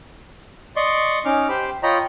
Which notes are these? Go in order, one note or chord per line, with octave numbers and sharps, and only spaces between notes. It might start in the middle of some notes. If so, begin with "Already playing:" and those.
D5 D#5 C6 C#6
C#4 D#4 D6 F6
G4 C5 B5 D6
F4 C#5 D#5 G5 A#5 B5